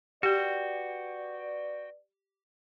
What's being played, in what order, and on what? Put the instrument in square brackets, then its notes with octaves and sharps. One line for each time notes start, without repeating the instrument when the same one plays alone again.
[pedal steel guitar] F#4 G5 [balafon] G4 [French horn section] B4 D5